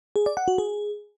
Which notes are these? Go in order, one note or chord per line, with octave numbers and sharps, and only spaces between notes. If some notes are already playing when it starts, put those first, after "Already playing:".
G#4
D5
F#5
F#4
G#4